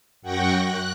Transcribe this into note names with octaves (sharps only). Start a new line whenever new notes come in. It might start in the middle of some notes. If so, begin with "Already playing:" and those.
F#2 F#5 G5 C#6 A#6
F#6